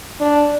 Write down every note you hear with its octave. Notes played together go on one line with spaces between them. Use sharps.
D4